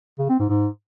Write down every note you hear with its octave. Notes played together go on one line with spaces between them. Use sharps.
C#3
C4
G#2
G#2